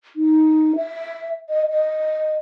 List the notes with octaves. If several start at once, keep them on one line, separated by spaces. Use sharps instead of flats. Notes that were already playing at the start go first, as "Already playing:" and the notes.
D#4
E5
D#5
D#5